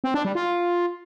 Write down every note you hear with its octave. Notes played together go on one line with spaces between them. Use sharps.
C4
D4
G3
F4